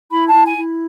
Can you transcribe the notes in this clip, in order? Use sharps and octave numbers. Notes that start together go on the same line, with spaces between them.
E4 B5
E4 A5
G#5
E4